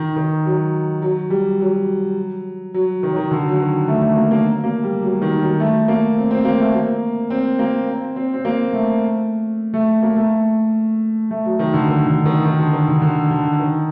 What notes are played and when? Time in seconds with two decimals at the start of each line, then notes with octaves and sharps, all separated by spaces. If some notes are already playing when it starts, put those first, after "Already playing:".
Already playing: D#3
0.16 D#3
0.46 F#3
1.02 F#3
1.30 G3
1.60 F#3
2.74 F#3
3.03 D#3
3.10 F#3
3.16 D#3
3.31 D3
3.48 F#3
3.60 D#3
3.88 A3
4.02 A3
4.16 A#3
4.31 A#3
4.64 A#3
4.83 G3
5.03 F#3
5.22 D#3
5.40 F#3
5.60 A3
5.88 A#3
6.16 C4
6.31 C4
6.45 A#3
6.60 A3
6.74 A#3
7.30 C4
7.59 A#3
7.89 C4
8.16 C4
8.34 C4
8.45 A#3
8.73 A3
9.74 A3
10.03 A#3
10.16 A3
11.31 A3
11.45 F#3
11.59 D#3
11.74 D3
11.88 D#3
12.07 D3
12.25 D#3
12.45 D#3
12.59 D3
12.73 D#3
12.88 D3
13.02 D3
13.31 D3
13.59 D#3